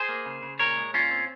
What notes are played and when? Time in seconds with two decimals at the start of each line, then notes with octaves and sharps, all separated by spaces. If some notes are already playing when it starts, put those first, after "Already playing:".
Already playing: G#4 C5
0.09 A#3
0.26 C#3
0.42 C#3
0.59 A#2 A#4 C#5
0.76 G#3
0.93 A#2 C#4 F4
1.11 C4